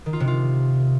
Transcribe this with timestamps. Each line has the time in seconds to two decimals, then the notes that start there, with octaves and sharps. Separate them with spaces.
0.06 D#3
0.13 F4
0.20 C3
0.27 F4